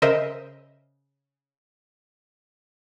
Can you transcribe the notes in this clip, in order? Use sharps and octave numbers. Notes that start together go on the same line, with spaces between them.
C#3 A#4 C5 D#5 E5